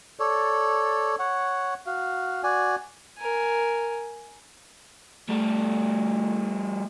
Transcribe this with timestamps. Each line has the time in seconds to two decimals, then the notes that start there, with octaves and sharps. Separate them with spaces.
0.19 A4 C#5 D5
1.19 C#5 F#5
1.86 F#4 F5
2.43 F#4 D5 G#5
3.18 A#4 G#5
5.29 G3 A3